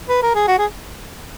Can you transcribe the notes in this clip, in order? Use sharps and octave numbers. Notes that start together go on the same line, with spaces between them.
B4
A#4
G#4
F#4
G#4